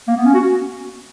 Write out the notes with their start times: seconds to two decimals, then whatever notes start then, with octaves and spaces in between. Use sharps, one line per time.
0.08 A#3
0.17 B3
0.25 C#4
0.34 F#4